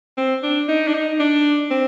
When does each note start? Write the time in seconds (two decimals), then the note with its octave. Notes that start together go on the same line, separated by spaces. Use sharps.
0.18 C4
0.43 D4
0.69 D#4
0.88 D4
0.94 D#4
1.20 D4
1.71 C4